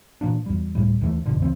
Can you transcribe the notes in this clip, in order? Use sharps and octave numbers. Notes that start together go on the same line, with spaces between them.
A#2 E3 A#3 D4
E2 G3
D1 F2 A2 G3
D#2 D#3 E3 A3
G1 F2 B2 D3
D2 C#3 E3 C4